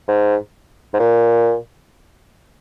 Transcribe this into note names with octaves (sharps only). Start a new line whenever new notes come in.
G#2
G#2
A#2